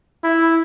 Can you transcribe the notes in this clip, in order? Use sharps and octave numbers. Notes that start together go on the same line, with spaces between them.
E4